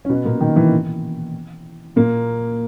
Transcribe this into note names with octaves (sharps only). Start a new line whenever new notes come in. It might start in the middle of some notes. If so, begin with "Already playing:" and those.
C#4
B2 B3
A#2 A#3
D#3
E3
A#2 A#3